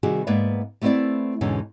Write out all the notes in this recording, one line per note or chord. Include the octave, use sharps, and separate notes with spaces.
C3 D#3 G3 F#4 G#4
G#2 A#3 B3 B4 D5 E5
G3 A3 B3 C4 E4 D5
E2 G#2 B2 D3 C#4 D#4